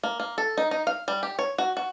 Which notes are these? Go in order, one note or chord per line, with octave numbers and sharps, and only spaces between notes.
A#3
A#3
A4
D#4
D#4
F5
G3
G4
C#5
F#4
F#4